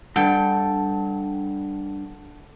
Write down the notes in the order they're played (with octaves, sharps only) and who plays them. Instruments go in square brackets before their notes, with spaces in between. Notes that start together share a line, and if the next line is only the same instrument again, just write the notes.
[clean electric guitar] G2 [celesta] D4 F#5 [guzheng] A4 G5